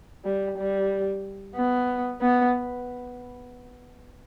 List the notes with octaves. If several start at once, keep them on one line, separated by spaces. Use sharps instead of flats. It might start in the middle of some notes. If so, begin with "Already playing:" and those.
G3
G3
B3
B3